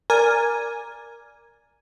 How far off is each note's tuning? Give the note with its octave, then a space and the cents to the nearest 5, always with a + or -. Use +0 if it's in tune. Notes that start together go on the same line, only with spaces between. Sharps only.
A#4 +5 D5 +0 G#5 +0